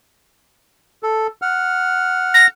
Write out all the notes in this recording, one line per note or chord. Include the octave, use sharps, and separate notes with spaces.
A4
F#5 F6
A#6